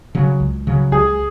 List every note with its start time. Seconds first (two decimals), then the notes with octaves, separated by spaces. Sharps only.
0.15 C#3 F#3
0.40 C#2
0.67 C#3 F#3
0.92 C#2 G#4